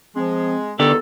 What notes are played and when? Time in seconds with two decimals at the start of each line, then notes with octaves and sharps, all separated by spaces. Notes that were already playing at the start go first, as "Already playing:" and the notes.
0.16 F3 G#3 C4
0.79 E2 G2 D3 D#3 B3 G4 A4 D5